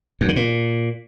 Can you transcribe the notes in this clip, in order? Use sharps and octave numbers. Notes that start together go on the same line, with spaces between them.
F#2
D3
A#2